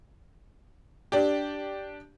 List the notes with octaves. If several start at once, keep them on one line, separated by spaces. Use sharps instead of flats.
D4 G4